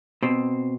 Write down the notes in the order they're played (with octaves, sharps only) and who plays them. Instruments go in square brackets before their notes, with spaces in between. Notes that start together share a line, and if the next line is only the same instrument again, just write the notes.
[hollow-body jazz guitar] B2 C4